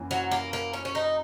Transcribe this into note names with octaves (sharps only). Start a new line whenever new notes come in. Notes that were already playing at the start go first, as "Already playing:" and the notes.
Already playing: F#2 E3 A#3
F#3
A#3
A#3
C#4
C#4
D#4